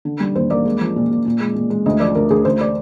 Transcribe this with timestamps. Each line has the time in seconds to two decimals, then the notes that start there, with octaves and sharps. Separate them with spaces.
0.05 D3
0.20 G3
0.35 D#2 C5
0.50 A#3 D5
0.65 G#3
0.81 F3
0.96 A#2
1.11 A#2
1.25 A#2
1.40 G#3
1.56 A#2
1.70 G#3
1.86 D2 D#5
2.00 F3 D5
2.15 D2 A#4
2.30 D2 G#4
2.45 D2 C5
2.61 D5